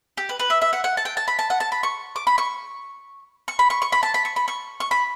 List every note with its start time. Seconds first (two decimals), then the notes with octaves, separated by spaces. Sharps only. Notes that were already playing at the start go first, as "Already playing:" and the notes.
0.17 G4
0.29 B4
0.40 B4
0.50 E5
0.62 E5
0.73 F#5
0.84 F#5
0.97 A5
1.05 G5
1.17 A5
1.28 B5
1.39 A5
1.50 F#5
1.60 A5
1.72 B5
1.83 C#6
2.16 D6
2.27 B5
2.38 C#6
3.48 C#6
3.59 B5
3.70 C#6
3.82 C#6
3.92 B5
4.03 A5
4.14 B5
4.25 C#6
4.36 B5
4.48 C#6
4.80 C#6
4.91 B5